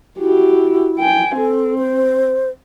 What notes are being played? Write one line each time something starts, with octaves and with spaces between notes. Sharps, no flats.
E4 F#4 G4
G5 G#5
C4 A4
C5